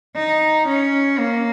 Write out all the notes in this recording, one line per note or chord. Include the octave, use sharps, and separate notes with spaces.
D#4
C#4
A#3